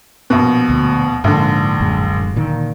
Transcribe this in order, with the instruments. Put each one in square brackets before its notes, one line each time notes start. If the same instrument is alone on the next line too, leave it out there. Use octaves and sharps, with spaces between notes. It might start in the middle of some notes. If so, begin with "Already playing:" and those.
[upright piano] A#1 B2
[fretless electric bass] D2
[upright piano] A#1 D3 [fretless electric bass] G#2
[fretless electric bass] D1 F#2 G#3
A#2 D3 D#3